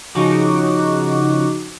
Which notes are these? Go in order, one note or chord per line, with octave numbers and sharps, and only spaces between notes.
C#3 F3 D#4 F#4 F#5 D6